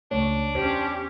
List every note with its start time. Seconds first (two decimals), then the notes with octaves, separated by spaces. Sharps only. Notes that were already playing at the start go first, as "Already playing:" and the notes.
0.11 C#2 C#3 A3 D4 C#5
0.55 E2 C#4 G4 C5